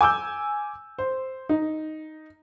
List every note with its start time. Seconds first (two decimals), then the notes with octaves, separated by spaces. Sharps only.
0.01 G#5 D6 E6 G6
0.99 C5
1.49 D#4